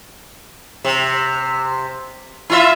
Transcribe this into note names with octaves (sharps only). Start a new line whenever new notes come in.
C3
E4 F4 E5